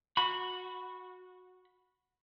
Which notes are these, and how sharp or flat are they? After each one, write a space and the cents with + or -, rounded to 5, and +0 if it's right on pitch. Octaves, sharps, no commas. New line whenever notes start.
F#4 -15 B5 +0